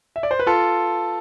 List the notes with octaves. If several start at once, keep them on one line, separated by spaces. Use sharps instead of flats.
E5
D5
C5
B4
F4 A4